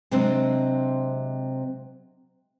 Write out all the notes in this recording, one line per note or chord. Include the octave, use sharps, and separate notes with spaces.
C3 F#3 G#3 C4 D4